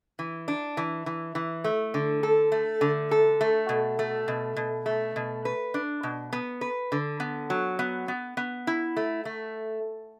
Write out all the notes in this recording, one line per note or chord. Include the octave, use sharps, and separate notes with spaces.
E3
D4
E3
E3
E3
A3
D3
A4
A3
D3
A4
A3
B2
A3
B2
B2
A3
B2
B4
D4
B2
B3
B4
D3
B3
F#3
B3
B3
B3
E4
A3
A3